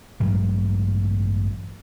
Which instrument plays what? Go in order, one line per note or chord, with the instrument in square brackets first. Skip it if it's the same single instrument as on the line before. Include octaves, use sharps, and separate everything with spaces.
[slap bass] A1 G2 F#3 G#3